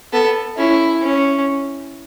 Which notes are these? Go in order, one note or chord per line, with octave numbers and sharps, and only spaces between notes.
B3 A4
C#4 E4
C#4